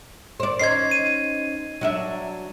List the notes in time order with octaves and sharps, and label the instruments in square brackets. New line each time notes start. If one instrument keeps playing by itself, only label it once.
[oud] C5 D5
[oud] C#4 D#4 C5 [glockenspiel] G#6 C7
[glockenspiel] D#7
[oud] F#3 D4 E5